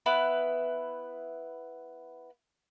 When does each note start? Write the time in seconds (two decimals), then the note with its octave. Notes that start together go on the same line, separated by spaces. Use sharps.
0.06 B3 E4 B4